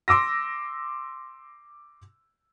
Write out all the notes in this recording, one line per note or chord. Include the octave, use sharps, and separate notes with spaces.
C6 D6 E6 A#6